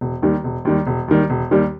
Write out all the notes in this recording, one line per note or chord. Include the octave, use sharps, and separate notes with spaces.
E1
D#2 D#3 G3
E1
D#2 D#3 G3
E1
D#2 D#3 G3
E1
D#2 D#3 G3